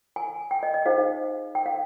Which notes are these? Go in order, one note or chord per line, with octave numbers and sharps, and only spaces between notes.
G#5
G5
D#5
D#5
D#4 G#4 C5 F5
G5
F5